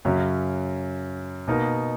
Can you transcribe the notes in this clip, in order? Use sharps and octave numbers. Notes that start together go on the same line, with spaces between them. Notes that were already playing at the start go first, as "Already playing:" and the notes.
F#2 C#3 F#3 C#4
B2 A#3 D#4 A#4